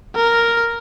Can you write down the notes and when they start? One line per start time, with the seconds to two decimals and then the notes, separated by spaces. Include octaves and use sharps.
0.16 A#4